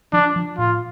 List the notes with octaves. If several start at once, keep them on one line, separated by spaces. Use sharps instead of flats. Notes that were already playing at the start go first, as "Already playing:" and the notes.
F3 D4
F3
A2 F4